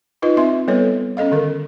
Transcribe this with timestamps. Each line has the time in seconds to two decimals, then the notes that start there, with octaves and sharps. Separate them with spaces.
0.22 D#4 F4 B4 D#5
0.37 C4 E5 C6
0.68 G3 B3 A4 B4 C#5
1.17 C#4 A4 D#5 F5
1.31 D3 D#3 A#4